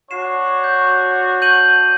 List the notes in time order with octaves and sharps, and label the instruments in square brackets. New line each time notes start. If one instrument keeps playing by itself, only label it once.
[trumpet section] D4 F#4 C#5 [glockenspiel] C7 E7
[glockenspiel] G6
G6 D#7 F#7